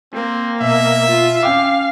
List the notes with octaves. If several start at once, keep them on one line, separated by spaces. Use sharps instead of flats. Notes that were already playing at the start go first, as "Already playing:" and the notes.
A#3 C4
B2 E5
F4
C#4 F5 G5 D6